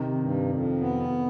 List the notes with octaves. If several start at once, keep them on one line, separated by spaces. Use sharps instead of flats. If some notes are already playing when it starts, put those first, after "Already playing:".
Already playing: C3 D#3
G2
F2
B3